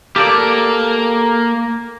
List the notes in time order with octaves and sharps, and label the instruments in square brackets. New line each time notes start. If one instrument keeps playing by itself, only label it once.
[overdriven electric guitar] A#3 [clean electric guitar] G4 A4 D5